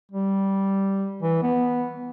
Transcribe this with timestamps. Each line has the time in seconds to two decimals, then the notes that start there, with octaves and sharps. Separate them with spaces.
0.12 G3
1.22 E3
1.43 B3